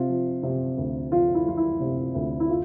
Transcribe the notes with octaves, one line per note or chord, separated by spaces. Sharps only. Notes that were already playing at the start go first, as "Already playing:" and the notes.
Already playing: C3 F4
F3
C3
D2
F3 F4
E4
F3 F4
E4
C3
D2
E4
F4